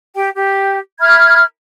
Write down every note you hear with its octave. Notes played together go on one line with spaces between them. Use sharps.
G4 G5
G4
E5 B5 F6 G#6